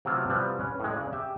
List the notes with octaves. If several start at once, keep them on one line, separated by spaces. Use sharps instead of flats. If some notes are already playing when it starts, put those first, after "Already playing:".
C3 F#3 A3 B3 F4 A4
C3 E3 F3 G3 B3
C#4 B4
A2 G#3
C#3 D5
G4 E5 G5